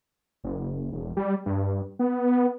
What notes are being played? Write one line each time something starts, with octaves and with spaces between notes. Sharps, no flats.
F#1
E1
G3
G2
B3